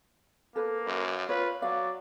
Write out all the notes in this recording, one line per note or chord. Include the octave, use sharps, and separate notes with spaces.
A#3 A4 B4
F#2
F4 B4 C#5
F#3 D5 F5